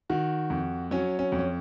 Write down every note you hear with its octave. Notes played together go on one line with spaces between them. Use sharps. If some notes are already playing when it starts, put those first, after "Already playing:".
D#3 F#4
F2
F#3 C#4
C#4
F2
C#4